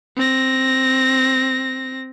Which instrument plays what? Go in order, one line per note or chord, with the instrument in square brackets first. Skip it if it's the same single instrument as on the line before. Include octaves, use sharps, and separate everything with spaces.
[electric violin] C4 A#6